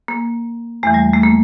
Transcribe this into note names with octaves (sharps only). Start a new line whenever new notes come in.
A#3
E2 E3 A3
G3
A3
A#3